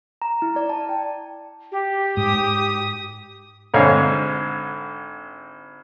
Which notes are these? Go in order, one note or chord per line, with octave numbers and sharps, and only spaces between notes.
A#5
E4
D5
A5
G5
G4
G#2 D#6
G#1 G#2 D3 C#5 F5